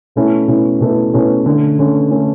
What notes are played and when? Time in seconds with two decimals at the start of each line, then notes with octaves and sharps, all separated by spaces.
0.16 B2 A3 C#4 E4
0.47 B2 A3 C#4 E4
0.80 B2 A3 C#4 E4
1.13 B2 A3 C#4 E4
1.46 D3 A3 C#4
1.79 D3 A3 C#4
2.11 D3 A3 C#4